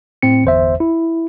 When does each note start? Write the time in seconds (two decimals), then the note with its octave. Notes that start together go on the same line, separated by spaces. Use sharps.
0.22 A2 C4 C#7
0.44 G1 E2 C5 E5
0.80 E4